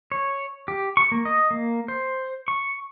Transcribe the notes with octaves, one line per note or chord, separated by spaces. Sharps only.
C#5
G4
C#6
A#3
D#5
A#3
C5
C#6